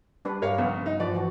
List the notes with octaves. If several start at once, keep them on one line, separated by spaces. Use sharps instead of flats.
G3 D4 B4
G2 G4 A#4 C#5 F5
A#1 C#3 B3
D#4
F3 B4 D5
E3 F#4